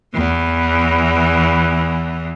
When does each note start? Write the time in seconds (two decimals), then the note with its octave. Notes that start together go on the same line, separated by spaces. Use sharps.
0.14 E2 E3